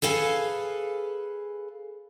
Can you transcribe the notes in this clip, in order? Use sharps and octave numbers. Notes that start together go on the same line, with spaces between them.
G#4 A4 B4 F5 G#5